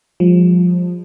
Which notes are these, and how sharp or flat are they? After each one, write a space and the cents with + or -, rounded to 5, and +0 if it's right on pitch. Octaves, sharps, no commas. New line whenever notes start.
F3 +20 G#3 -45